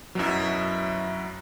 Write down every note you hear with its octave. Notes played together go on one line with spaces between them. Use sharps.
F#2 B2 F#3 E4